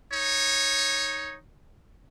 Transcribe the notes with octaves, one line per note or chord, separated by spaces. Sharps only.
D#4 C#5